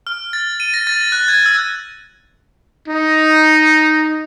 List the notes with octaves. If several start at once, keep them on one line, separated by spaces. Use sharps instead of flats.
F6
A6
D#7
A#6
A6
F#6
G#6
E6
D#4